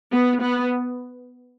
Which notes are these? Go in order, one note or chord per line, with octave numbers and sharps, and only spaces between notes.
B3
B3